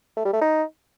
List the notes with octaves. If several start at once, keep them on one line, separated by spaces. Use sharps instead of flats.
A3
G3
A3
D#4